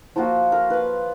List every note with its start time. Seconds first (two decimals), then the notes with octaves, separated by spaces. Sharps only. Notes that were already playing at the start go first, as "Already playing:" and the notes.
0.16 F3 A#3 F4 F#4
0.52 A#4
0.70 B4 F5